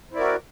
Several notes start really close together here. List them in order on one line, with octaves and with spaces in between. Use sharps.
C4 E4 D5 A#4 F#4